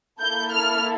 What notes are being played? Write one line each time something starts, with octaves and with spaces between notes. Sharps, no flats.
A#3 E4 A4 G6
F6